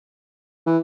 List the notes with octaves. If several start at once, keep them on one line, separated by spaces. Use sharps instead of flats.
E3